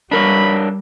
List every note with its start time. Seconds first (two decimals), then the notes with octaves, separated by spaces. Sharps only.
0.11 G3 D4 A#4 C#5 B5